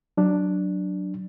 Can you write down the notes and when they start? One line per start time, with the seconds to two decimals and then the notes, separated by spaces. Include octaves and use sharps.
0.17 F#3 D4